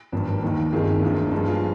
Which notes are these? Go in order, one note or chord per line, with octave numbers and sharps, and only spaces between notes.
G#1 G2 F3 A#3
D#2 D#3 A#3
G1 F2 D#3 F4 G#4
D2 D3 F3 A#3
G2 F3 G#3
F4 G#4